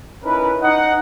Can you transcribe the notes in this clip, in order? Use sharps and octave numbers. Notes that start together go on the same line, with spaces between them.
C#4 D#4 E4 A#4 B4
D#4 D#5 F#5